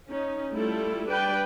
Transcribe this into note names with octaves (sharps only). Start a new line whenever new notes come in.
C#4 D#4
G3 A3 E4 F4 A4
G3 D4 B4 D5 G5